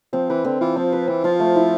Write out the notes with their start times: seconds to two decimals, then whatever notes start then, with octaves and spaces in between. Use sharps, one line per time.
0.13 F3 C4
0.30 E3 B4
0.45 D3 C4
0.61 E3 F4
0.76 F3 C4
0.93 B4
1.08 E3 C4
1.24 F3 F4
1.40 A3
1.55 E4